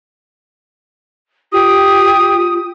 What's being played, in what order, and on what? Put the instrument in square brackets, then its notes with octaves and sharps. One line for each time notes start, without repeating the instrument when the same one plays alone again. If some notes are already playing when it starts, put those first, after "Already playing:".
[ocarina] F4 [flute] G4 [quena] D#6